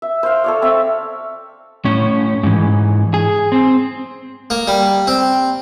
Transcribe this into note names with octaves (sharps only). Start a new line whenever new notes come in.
E5
C5 F5
A4 C#5 D5
C4 E5
A2 C#4
G#2 E3
G#4
C4
A#3
G3
C4